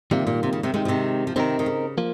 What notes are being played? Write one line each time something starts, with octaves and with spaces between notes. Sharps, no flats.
C3 D#3 G3 A#3 F4
A#2
C3
C#3
C3 D#3
C3 D#3 G#3 D#4 G4
F3
C3 D#3
F3
C3 D#3 C4 D#4 A#4
D#3
C#3
F3 A#3